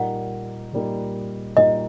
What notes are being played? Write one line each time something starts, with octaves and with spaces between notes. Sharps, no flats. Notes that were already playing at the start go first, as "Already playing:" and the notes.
Already playing: A#2 G3 A#3 D#4 F#5
A#2 G3 A#3 D#4
A#2 G3 A#3 D#4 D#5